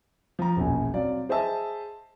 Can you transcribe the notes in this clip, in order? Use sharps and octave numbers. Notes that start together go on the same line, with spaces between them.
F3 A#5
E1 A#1 F#2 G#5
F#3 C4 D5 F5
G#4 C5 D#5 E5 A5 E6